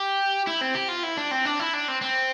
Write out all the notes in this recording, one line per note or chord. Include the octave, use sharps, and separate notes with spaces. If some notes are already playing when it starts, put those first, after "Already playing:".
Already playing: G4
E4
C4
G4
F4
E4
D4
C4
D4
E4
D4
C4
C4